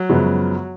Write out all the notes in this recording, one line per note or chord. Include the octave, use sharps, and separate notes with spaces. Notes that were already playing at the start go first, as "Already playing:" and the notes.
Already playing: F#3
F#2 C#3 F3 G#3 B3